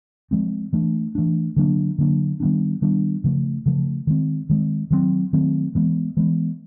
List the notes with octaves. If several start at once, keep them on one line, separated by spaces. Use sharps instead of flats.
F3 G#3 C4
E3 A3 D4
E3 A3 D4
D3 F#3 A#3 D4
D3 F#3 A#3 D4
D#3 G3 B3 D4
D#3 G3 B3 D4
C#3 F3 A3
C#3 F3 A3
D#3 G#3 C4
D#3 G#3 C4
D#3 F#3 A3 C4
D#3 F#3 A3 C4
E3 G#3 B3
E3 G#3 B3